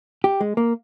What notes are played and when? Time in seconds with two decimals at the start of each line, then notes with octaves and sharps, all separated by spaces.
0.24 G4
0.41 G#3
0.57 A#3